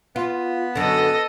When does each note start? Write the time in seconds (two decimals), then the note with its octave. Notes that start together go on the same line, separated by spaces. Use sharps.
0.16 B3 F4
0.75 F#2 D3 A4 D#5